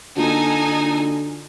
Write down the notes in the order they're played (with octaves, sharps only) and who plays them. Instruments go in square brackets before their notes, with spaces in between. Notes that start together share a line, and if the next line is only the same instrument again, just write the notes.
[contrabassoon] D3 [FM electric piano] A#3 F4 F#4 [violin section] D#4 A4 G#5